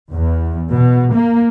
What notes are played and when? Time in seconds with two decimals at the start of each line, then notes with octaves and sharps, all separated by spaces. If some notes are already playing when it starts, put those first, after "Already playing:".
0.12 E2
0.72 B2
1.14 A#3